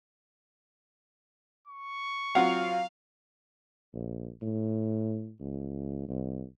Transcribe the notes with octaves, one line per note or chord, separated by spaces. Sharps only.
C#6
F#3 C4 F4 F5 F#5
A#1
A2
C#2
C2